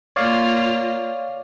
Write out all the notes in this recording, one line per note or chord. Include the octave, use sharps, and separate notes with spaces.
A#3 F4 C#5 D5 F5